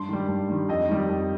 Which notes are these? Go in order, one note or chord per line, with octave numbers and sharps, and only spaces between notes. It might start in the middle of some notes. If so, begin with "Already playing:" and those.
Already playing: G2 C6
D#3 G3
G2
D#3 G3
F2 D#5
D#3 G3
F2